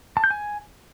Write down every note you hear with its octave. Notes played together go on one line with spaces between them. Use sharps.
A5
G6
G#5